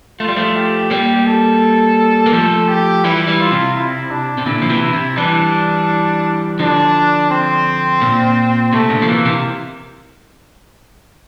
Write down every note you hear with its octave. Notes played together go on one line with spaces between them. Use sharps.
A3 F4
G3
F3 A3
G4
G3 A#3 G4
A4
A#3
F3 A3 A4
G4
E3 G3 E4
E3 G3
F4
C3
E4
D4
C3
A#2 D3 E4
F3
C3 E3
E4
C3
E3 G3 D4
D3 F3 D4
C4
A#2
C3 A3
A#2 D3
F3
C3 E3 A#3
C3 E3